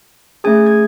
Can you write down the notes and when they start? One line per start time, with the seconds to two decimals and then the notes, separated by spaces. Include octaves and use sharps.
0.44 A3 C#4 G#4 G#5 G#6
0.67 G#6